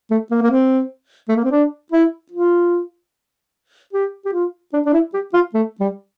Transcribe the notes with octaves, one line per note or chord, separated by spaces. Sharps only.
A3
A#3
A#3
C4
A3
A#3
C4
D4
E4
F4
G4
G4
F4
D4
D4
E4
G4
F4
A3
G3